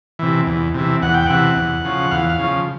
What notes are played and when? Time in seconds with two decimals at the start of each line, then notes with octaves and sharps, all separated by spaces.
0.19 C3 E3
0.47 E2
0.74 C3 E3
1.02 E2 F#5
1.14 G5
1.26 C3 E3 F#5
1.56 E2
1.84 C#3 F3
2.11 E2 F5
2.29 F5
2.39 C#3 F3